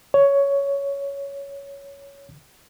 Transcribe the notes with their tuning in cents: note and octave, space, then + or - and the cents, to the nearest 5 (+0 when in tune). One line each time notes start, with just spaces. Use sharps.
C#5 +10